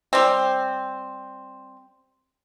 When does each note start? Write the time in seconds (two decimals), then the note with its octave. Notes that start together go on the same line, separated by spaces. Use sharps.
0.13 G3 C4